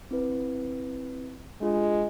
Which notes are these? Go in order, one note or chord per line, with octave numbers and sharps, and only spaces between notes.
C4 E4 B4
G#3 D4 F4 G4